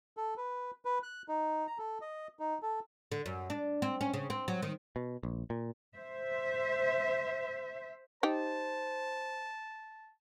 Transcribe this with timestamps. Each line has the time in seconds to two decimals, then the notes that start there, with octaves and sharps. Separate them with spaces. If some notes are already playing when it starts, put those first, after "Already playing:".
0.17 A4
0.37 B4
0.85 B4
1.03 F#6
1.28 D#4
1.67 A#5
1.78 A4
2.01 D#5
2.39 D#4
2.62 A4
3.12 D3
3.26 F#2
3.50 D4
3.82 C4
4.01 C#4
4.13 C#3
4.30 C4
4.48 F#3
4.62 D#3
4.96 B2
5.23 A#1
5.50 A#2
5.94 C5 E5
8.23 D#4 G4 C5 A5